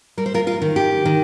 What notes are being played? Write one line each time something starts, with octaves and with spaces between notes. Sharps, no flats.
G3 A#4
C5
F4 A#4
F4 A#4
D#3
G4
D#3